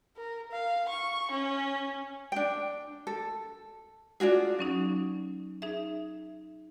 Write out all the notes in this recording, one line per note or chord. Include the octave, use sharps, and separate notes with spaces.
A#4
F5
C#6
C#4
D4 G5
A4
D4 F4 F#4 G#4
F#3 C#4 D#4
D#4 G#4 E5